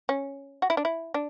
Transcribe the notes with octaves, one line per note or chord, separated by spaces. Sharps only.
C#4
F#4
E4
D4
E4
D4